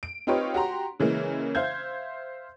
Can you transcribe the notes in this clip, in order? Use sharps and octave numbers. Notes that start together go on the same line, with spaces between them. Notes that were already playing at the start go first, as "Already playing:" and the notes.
D7
C4 D#4 F4 G4 B4 C#5
F#4 G4 A#5 C6
C#3 E3 G#3 A#3
C5 E5 F5 G6 G#6